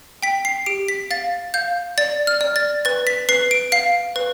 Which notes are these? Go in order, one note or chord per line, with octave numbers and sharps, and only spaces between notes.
G5 B6
C7
G4 D7
B6
F5 A6
F5 G6
D5 A6
F6
D5
A6
B4 A6
B6
B4 C7
D7
F5 C7
B4